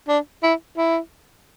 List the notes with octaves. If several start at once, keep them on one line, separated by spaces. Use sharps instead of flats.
D4
E4
E4